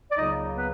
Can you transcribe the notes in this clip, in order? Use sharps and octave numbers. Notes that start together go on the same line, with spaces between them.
D5
C#2 C#3 F#3 A#3 D#4 D#5
B3 B4